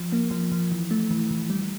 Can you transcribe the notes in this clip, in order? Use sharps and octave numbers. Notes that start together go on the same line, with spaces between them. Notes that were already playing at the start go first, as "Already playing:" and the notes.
Already playing: F3
A#3
F3
F3
E3
A3
E3
E3
G3